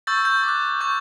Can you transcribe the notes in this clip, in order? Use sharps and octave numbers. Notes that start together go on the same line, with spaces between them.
C#6 E6 G6 A6
G6
D6 F#6
C#6 G6